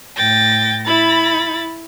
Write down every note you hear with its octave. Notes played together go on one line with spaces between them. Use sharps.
A2 G5 A6 A#6
E4 B5 A6